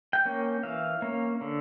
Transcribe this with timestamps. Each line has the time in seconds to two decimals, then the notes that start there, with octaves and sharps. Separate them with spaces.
0.13 G5
0.25 A#3 C#4
0.63 E3 F5
1.02 A#3 C#4
1.41 D3